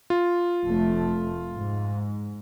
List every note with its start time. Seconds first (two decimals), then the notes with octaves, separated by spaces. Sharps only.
0.10 F4
0.66 F1 A3
1.52 G#2